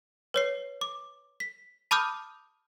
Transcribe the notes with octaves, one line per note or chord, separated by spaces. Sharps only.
B4 C#5 C7
D6
B6
A5 B5 D6 D#6 F6 G6